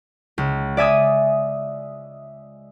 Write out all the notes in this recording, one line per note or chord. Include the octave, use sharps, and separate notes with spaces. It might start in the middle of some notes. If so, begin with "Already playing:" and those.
C#2
D5 E5 G#5 D#6